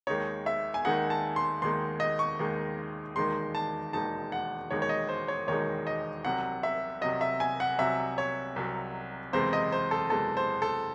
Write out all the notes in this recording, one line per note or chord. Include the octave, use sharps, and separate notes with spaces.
D#2 D#3 G#3 D#4 C#5
E5
G#5
D#2 D#3 G#3 D#4 F#5
A5
C6
D#2 D#3 G#3 D#4 C6
D#5
C#6
D#2 D#3 G#3 D#4
E1 D#2 D#3 G#3 D#4 C6
A5
E1 D#2 D#3 G#3 D#4 A5
F#5
E1 D#2 D#3 G#3 D#4 C#5
C#5
D#5
C5
C#5
E1 D#2 D#3 G#3 D#4 C#5
D#5
C2 C3 F#3 F#5
E5
C2 C3 F#3 D#5
E5
G#5
F#5
C2 C3 F#3 E5
C#5
C2 C3 F#3
F#1 E2 C3 E3 G#3 C5
D#5
C5
A4
F#1 E2 C3 E3 G#3 A4
C5
A4